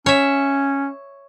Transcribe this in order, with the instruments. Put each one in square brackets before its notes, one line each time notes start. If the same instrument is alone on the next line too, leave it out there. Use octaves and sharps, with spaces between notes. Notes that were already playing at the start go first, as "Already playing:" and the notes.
[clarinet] C#4 [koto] C#5 E5